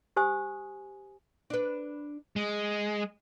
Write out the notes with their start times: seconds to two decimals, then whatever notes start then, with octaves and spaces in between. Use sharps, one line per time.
0.16 G4 C5 G#5 D#6
1.50 D4 B4
2.36 G#3